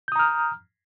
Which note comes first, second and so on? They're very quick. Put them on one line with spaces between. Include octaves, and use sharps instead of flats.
G6 D#6 A#5 F6